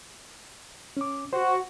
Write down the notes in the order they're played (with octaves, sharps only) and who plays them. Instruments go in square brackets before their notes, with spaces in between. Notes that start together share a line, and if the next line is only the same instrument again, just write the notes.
[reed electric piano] C#4 D6
[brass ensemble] F#4 [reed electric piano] C5